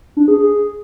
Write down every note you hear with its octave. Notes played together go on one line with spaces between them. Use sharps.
D4
G#4
G#4